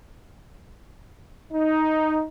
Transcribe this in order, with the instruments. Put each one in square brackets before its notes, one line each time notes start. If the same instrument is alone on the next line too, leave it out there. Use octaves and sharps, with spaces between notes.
[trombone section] D#4